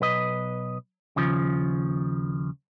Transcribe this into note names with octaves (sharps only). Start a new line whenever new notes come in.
B1 B4 D#5
D#2 C#3 F3